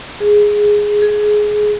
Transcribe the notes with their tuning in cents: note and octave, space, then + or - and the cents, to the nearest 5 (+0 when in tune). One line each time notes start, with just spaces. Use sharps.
G#4 +0
G#4 +15